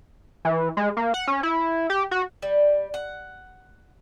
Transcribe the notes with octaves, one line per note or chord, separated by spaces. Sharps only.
E3
G#3
A#3
F#5
C#4
E4
G4
F#4
G3
F#5